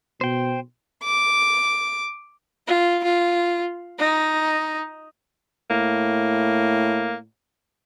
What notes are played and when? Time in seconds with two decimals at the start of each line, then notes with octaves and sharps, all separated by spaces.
0.21 B2 C5 G5
1.04 D6
2.67 F4
3.04 F4
3.99 D#4
5.70 A2 A#3